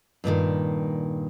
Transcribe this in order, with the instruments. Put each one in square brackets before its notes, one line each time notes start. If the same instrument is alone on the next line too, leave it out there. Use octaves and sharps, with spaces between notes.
[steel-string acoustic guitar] G2 A#2 D3 D#3